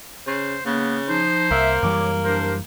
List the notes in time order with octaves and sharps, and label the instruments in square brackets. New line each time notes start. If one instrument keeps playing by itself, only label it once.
[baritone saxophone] C#3 [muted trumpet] C5
[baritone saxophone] C#3 [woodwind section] A#3 [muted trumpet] B3
[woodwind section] F3 D#4 [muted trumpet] C5
[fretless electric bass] C2 [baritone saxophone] A#3 [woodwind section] E5
[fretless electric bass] F#2 E3 G3 [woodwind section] C#5 D6
[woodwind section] D4 G4 A#4 [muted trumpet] C5